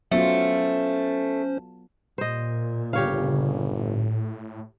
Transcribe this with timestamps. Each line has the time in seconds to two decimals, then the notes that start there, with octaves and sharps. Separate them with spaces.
0.11 F#3 A3 B3 C#4 F4 C5
2.18 A#2 C5 D#5
2.93 G1 C#3 G4 C#5 F5
3.73 A2